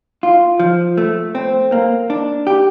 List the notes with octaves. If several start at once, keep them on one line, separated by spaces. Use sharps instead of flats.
F4
F3
A3
C4
A#3
D4
G4